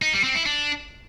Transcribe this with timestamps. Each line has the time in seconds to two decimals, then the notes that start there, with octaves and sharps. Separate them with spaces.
0.02 D#4
0.13 G3
0.24 C4
0.35 E4
0.46 D4